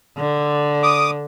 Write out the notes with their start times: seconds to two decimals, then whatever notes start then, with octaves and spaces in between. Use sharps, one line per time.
0.18 D3
0.83 D6 D#6